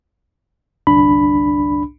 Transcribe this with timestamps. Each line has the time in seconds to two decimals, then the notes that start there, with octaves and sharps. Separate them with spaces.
0.87 G1 C2 D4 B5